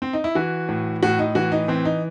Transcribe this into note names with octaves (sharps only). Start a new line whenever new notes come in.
C4
D#4
E4
E3 F#4
A2
A2 F#4
D#4
E3 F#4
D#4
E3 C4
D#4